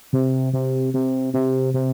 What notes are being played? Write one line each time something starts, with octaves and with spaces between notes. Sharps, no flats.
C3
C3
C3
C3
C3